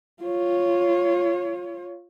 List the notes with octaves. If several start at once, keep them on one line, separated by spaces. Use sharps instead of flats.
F4 C#5